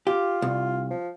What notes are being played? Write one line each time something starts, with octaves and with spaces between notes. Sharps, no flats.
F4 G4
C2
F3